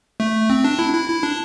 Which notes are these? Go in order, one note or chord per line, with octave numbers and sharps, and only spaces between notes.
A3
C4
D4
E4
E4
E4
D4